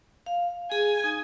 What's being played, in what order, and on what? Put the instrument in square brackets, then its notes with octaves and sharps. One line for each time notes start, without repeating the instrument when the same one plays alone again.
[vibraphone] F5
[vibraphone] G#4 [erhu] G#5
[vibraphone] D#4